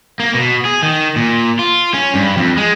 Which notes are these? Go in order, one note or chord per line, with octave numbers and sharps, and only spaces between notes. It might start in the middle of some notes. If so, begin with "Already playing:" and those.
A#3
B2
G#4
D#3
A#2
F4
C#4
G2
F2
G#3